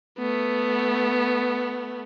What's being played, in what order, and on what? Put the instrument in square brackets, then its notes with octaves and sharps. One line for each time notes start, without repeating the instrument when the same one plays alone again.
[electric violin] A3 B3